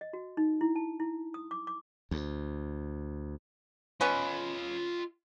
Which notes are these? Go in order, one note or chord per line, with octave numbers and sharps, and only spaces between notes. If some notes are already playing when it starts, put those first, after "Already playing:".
D#5
F#4
D#4
E4
A5
E4
D#6
D6
D6
D2
B3 C#4 F4 B4 D#5